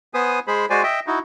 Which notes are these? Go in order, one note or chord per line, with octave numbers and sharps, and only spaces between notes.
B3 B4 C5 G#5 D#6
G#3 G#4 C5 B5
G#3 F#4 C5 D5 G#5
D#5 E5 G5
D#4 E4 F#4